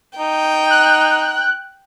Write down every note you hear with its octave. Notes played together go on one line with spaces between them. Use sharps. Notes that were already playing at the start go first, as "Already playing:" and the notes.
D#4 G5
F#6